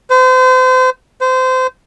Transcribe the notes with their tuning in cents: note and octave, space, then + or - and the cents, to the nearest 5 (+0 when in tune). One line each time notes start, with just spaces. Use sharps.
C5 -35
C5 -25